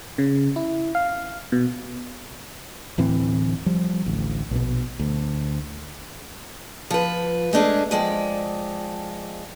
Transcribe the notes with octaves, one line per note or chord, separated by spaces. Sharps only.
C#3
E4
F5
B2
D1 A2 E3 C4
F3 G3
A1 D2
A#1 B2
D2
F3 B4
G#3 A3 D4 F#4 G#4
F3 G#3 D5 G5